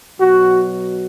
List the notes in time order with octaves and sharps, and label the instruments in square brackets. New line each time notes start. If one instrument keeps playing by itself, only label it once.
[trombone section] B2 F#3 F#4